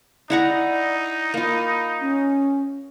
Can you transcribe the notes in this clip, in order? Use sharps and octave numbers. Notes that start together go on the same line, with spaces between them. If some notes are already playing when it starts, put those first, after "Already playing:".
D#4 E4 D5 F#5 A#5
A#3 F4 B5
C#4